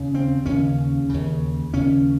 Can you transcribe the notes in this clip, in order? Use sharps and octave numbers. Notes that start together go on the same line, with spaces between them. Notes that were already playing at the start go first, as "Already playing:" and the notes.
Already playing: D#2 C#3
C4
D#2 C#3 C#4
D#2 C#3
D#2 C#3 C#4